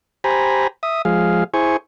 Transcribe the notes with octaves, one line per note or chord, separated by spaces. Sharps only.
G4 C5 G#5 A#5 B5
E5 D#6
F3 G#3 G#4 F5
E4 G#4 C5 G#5 C#6